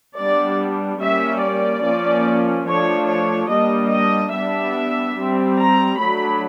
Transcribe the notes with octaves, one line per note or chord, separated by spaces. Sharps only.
G3 B3 D4 D5
G3 A#3 C#4 E5
D5
F3 A#3 C#4
F3 A3 D4 C#5
C#5
G3 A#3 D4 D#5
D#5
G3 B3 D4 E5
G3 C4
A#5
F#3 A3 D4 B5